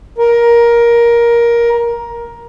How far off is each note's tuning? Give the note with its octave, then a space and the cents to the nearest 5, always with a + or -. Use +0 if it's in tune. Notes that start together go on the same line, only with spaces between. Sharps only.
A#4 +15